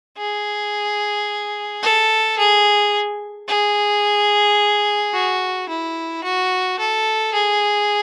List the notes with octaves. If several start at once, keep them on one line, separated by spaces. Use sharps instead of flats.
G#4
A4
G#4
G#4
F#4
E4
F#4
A4
G#4